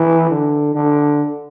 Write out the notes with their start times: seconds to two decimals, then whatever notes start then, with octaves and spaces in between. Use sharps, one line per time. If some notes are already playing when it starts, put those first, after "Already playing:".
Already playing: E3
0.31 D3
0.75 D3